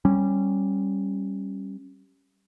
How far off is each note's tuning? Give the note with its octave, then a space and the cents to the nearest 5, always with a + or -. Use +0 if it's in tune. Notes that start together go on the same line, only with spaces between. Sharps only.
G3 -5 C#4 -15